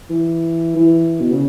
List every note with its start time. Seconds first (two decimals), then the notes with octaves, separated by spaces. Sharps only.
0.10 E3
0.76 E3
1.20 B2
1.32 C#3